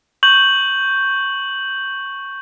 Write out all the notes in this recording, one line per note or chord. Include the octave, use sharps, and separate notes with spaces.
C#6 G6 F#7